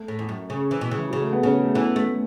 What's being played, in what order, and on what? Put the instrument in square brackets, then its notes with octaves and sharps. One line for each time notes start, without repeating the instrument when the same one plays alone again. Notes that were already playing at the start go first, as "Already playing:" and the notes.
Already playing: [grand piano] A3
[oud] A2
E2
F#2
C#3
E3
B2
C#3
[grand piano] E3
[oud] C#3 [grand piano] F#3
[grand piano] A3
B3
[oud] C#3 [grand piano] C#4
[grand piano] A3
[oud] E3 [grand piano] B3
[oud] A3